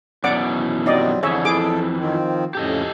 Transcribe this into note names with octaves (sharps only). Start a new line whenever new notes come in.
F#2 B2 E3 D5 F#5 D6
F#3 G3 C4 D#4 D5 D#5
F2 D3 E3 G#4 C#5 E5
E4 G#4 A4 D6
D#3 F3 C4
F2 A2 C#3 G4 A4 D#5